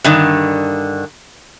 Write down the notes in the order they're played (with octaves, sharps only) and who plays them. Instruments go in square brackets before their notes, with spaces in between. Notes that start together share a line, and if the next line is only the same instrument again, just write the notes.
[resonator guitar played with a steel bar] G2 D3 D#3